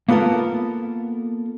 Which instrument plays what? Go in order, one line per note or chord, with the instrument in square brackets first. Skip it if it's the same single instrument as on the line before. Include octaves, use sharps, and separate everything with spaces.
[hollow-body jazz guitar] A#3 B3 F4 A4 A#4